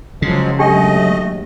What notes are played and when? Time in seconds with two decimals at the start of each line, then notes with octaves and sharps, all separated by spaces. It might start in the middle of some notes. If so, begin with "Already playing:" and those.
0.22 C#3 F3 F#3 G#3
0.59 D#2 F#3 G#3 A3 D4 G4 D#5 G5